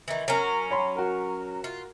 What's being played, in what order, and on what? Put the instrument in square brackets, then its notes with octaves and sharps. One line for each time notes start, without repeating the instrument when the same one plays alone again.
[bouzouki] D#3 E3
[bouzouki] F#3 C#4 [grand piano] A#4
[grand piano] C#5 B5 C6
F#4 A#4
[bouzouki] F4